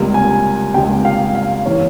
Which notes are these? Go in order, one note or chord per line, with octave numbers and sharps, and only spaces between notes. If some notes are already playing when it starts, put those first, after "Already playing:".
Already playing: C#2 C3 G3 A#3
G#5
C#2 C3 G3 A#3 G5
F5
F5
E3 A#3 C#5